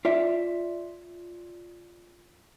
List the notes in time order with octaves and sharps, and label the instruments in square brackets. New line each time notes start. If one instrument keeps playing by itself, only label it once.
[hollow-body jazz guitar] F4 C#5 D5 E5